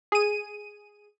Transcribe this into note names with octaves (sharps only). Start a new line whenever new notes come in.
G#4 D#7